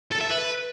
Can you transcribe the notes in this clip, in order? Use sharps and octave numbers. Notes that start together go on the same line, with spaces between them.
A4
E5
B4